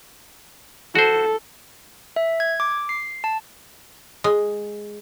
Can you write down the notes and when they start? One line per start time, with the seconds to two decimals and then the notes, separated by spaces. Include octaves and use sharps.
0.95 F#4 A4 C5
2.16 E5
2.40 G#6
2.60 D6
2.89 C7
3.24 A5
4.24 G#3